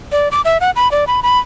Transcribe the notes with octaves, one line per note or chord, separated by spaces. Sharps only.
D5
D6
E5
F#5
B5
D5
B5
B5